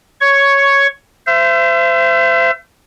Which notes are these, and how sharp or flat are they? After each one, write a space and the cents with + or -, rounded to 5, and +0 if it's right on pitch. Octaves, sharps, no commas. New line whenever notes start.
C#5 +5 C#6 +0
C5 -20 E5 +40